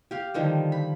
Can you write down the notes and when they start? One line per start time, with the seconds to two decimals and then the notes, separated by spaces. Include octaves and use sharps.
0.11 G4 F5
0.34 D3 D#3 F3 G3
0.72 B5